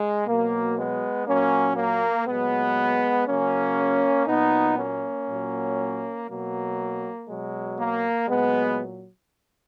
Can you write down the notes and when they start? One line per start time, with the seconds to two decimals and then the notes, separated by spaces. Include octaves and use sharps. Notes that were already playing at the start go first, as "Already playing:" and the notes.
Already playing: G#3
0.26 B2 F#3 A#3
0.77 G#3 B3
1.27 A#2 F#3 A#3 C#4
1.77 A#3
2.27 A#2 F#3 G#3 B3
3.27 C#3 F#3 A#3 C#4
4.27 A#2 F#3 B3 D#4
4.77 A#3 C#4
5.28 A#2 F#3
6.28 B2 F#3 A#3
7.28 B2 F#3 G#3
7.78 A#3
8.28 A#2 F#3 G#3 B3